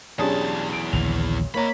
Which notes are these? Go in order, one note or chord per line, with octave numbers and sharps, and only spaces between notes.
B1 E2 C#4 D4 G4 G#4 A5 D#6
D7
A#1 D#2 D3 F7
A#3 C#5 D#5 A#5 B5